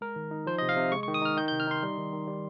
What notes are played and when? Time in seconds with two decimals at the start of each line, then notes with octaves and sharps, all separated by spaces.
0.01 G#3 A#4
0.16 D#3
0.31 D#4
0.46 F3 C5
0.58 D#5
0.62 C3
0.69 F5
0.76 C3
0.91 G#3 C#6
1.03 C#6
1.08 D#3
1.14 D#6
1.22 D#4 F6
1.37 D#3 G6
1.48 G6
1.52 C3
1.60 F6
1.67 D#4 C6
1.83 G3
1.97 D#3
2.13 D#3
2.28 G3